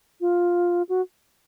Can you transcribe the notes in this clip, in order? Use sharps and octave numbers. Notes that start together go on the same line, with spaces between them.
F4
F#4